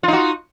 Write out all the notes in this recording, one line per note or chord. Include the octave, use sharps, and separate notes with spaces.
D#4 F4 F#4